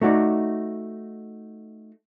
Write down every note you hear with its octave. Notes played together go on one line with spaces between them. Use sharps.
A3 D#4 F#4 D5